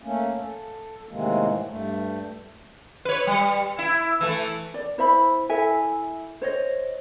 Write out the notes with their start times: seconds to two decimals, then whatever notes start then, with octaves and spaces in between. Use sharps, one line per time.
0.02 A3 A#3 C#4
0.36 A4
1.09 A2 C3 D#3 E3 G#3 A#3
1.64 G2 A3
3.05 B4 C#5
3.27 G3
3.78 E4
4.21 E3 A3
4.74 D5
4.98 E4 C5 E5 B5
5.49 E4 A4 E5 G#5
6.42 C5 C#5 D#5